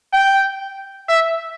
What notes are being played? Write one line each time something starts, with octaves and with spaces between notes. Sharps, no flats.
G5
E5